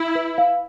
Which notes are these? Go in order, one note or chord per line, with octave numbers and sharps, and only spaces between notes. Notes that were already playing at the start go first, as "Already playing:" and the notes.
Already playing: E4 E5
B4
F5